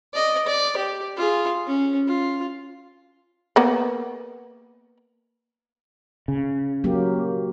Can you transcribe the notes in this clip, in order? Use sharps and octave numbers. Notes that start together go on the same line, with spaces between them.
D5 D#5
D5
G4
F4 G#4
C#4
F4
A#3 B3
C#3
F#3 A#3 G4